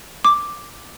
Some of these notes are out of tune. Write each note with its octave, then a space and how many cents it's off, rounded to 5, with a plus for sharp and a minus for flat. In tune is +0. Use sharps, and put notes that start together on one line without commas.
D6 +0